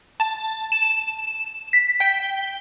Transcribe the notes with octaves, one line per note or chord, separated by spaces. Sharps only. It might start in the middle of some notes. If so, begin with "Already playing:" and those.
A5
E7
B6
G5